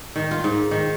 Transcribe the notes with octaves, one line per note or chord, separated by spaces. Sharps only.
D#3
F4
G#2
D#3